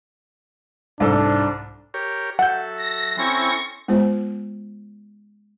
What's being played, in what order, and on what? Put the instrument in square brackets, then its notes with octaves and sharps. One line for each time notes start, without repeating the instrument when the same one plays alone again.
[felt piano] C2 A4 [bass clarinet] G#2 [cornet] D4
[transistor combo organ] G4 A#4 C#5
[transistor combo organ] F#3 A4 E5 [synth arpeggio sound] F#5 G6
[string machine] A#6
[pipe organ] C4 C#4 E4 [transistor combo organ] A4 C6 [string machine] C#6
[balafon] G#3 B3 F4 C5